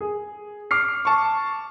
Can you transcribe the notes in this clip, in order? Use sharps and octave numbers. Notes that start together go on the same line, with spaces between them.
G#4
D6 F6 C7
A5 C#6